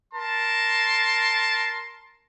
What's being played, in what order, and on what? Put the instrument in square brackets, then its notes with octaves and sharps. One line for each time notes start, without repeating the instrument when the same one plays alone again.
[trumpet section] A#4 A5 C6